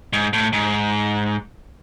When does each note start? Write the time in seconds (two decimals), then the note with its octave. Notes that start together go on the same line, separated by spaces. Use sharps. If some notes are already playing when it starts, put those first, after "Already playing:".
0.13 G#2
0.33 A2
0.53 G#2